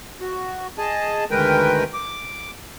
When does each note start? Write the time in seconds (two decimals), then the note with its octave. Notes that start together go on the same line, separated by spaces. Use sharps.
0.21 F#4
0.78 G#4 D#5 A5
1.31 D2 D#3 G#3 A#4 B4 G5
1.94 D6